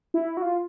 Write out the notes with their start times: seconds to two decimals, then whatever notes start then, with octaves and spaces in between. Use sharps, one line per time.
0.14 E4
0.37 F#4
0.42 F4